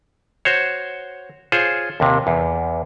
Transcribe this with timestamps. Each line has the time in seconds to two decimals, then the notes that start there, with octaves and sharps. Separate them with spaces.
0.45 F#4 C5 C#5
1.52 F4 G#4 C5 C#5
2.00 D#2 C3
2.27 E2